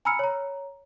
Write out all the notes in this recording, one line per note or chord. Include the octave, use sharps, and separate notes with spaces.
G#5 A#5 B5 E6 F6 C#7
C#5 A#5